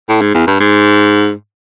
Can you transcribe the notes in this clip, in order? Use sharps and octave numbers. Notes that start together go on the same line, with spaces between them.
A2
G#2
E2
G2
G#2